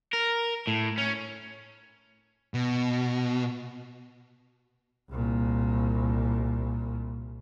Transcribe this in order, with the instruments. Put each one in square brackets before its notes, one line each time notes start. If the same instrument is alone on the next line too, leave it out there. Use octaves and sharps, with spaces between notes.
[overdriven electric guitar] A#4
A2
C#4
[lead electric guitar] B2
[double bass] C2 A#2